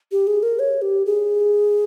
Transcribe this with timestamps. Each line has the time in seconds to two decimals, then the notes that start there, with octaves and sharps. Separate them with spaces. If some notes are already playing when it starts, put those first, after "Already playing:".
0.12 G4
0.27 G#4
0.43 A#4
0.59 C#5
0.82 G4
1.06 G#4